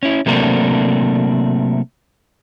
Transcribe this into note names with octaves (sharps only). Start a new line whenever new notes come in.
C#4 E4
C3 F#3 A3 A#3 C4 D4